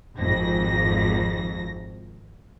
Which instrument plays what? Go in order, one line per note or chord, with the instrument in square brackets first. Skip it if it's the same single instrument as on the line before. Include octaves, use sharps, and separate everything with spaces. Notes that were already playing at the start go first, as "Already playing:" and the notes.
[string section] G#1 F2 A#6